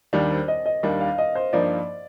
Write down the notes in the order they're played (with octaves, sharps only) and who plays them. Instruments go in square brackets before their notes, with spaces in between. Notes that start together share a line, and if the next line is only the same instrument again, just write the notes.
[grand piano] D#2 D#3 G3 D4 [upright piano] D5
[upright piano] C5
D#5
D#5
[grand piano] D#2 D#3 G3 D4 [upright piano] F5
[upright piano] F5
D#5
C5
[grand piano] G2 F3 A#3 D#4 [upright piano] D5